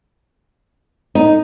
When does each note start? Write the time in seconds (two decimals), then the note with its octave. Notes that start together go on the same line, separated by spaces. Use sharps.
1.15 D#4